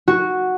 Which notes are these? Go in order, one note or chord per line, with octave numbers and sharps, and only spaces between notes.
F#4